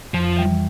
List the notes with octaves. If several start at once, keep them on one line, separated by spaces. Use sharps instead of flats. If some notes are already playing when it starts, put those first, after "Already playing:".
F2 F3
E3 G3